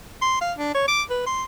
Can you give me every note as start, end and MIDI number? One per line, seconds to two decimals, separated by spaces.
0.22 0.41 84
0.41 0.52 77
0.58 0.73 62
0.75 0.85 73
0.88 1.02 86
1.10 1.24 71
1.26 1.44 84